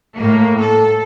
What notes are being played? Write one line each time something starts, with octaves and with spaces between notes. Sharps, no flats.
A2 A#3
A4